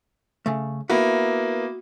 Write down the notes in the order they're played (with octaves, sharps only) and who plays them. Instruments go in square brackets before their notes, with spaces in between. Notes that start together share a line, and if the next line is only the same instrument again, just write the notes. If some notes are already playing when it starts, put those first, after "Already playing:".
[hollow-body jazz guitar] C#3 A3
[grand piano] A#3 B3 E4 [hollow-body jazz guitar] F#4 B5